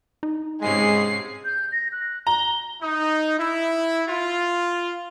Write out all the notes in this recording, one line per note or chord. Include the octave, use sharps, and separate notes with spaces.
D#4
G#2 C3 G#3 C#4 G#4 C7
G6
A#6
F#6
A#5 G7
D#4
E4
F4